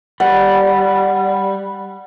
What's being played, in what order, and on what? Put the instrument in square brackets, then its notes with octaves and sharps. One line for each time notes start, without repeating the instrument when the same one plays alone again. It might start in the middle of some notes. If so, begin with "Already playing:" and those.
[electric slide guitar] G3 [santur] F#5